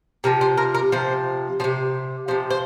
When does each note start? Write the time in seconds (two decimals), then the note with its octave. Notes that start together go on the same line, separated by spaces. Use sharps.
0.24 C3 F3 A#4
0.41 C5
0.58 A#4
0.75 A#4
0.92 C3 F3 C5
1.60 C3 F3 C5
2.28 C3 F3 C5
2.50 C5